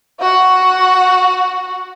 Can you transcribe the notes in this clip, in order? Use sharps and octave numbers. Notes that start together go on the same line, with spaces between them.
F#4 F#5